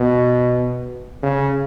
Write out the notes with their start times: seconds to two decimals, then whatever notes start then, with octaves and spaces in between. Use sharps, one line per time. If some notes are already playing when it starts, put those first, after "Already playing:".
Already playing: B2
1.23 C#3